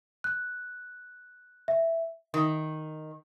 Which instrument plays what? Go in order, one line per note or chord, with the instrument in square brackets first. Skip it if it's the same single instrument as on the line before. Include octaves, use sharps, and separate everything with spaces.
[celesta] F#6
E5
[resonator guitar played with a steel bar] D#3